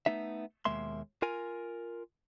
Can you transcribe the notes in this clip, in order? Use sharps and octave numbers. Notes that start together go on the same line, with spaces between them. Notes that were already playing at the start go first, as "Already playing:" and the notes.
A3 B3 D#4 E5
D#2 B2 G#3 A#3 E5 C6
F4 A#4 G#5